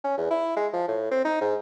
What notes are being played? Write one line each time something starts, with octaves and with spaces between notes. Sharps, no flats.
C#4
E2
E4
G#3
F3
A2
C4
D#4
G#2